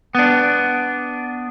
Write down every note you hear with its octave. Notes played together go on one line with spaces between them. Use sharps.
B3 D4